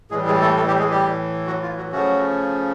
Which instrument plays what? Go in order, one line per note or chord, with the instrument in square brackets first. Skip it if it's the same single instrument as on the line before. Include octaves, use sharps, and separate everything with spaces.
[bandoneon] A2 E3 G3 G#3 G#4
G#3 G#4
A3 A4
A3 A4
G3 G4
G#3 G#4
G3 G4
F#3 F#4
F4
F#3 F#4
C#3 F3 F#3 A3 C#4 F#4